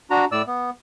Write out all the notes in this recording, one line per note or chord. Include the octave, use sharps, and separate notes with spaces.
D4 F#4 A#5
A2 D5 E6
B3